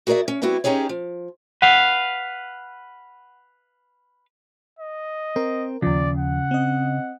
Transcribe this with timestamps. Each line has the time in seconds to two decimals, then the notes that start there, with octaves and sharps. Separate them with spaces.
0.07 F#4 G#4 A#4 C#5 D5 E5
0.28 C#4
0.42 G3 B3 C4 E4 F#4
0.64 C#4 D#4 G4 G#4 C#5
0.89 F3
1.62 B4 F5 F#5
4.79 D#5
5.36 C4 A#4
5.82 D#2 C#3 F3 D5
6.18 F#5
6.51 C4 D#5